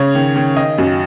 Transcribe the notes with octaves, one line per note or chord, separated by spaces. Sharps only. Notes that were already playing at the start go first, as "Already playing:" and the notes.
Already playing: C#3 C#5
D#3
D#3
D#3 D#5
F#2